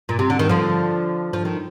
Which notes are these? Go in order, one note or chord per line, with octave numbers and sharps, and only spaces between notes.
A#2
C3
D3
D#3
D3 F3
F3
D#3